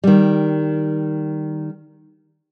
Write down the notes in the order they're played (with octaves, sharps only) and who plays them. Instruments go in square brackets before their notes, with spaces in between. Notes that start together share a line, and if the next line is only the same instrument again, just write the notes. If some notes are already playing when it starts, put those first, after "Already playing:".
[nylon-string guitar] D#3 G3